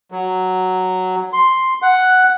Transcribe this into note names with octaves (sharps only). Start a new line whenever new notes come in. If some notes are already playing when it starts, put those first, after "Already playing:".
F#3
C6
F#5